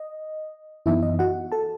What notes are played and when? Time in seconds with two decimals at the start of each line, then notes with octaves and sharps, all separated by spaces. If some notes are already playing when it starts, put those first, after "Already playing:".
Already playing: D#5
0.86 F#2 E3 B3 D#4 E4 E5
1.03 D#5
1.19 F#4 F#5
1.52 A4 A5